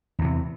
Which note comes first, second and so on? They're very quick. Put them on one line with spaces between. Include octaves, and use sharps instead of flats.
E2 E3 C3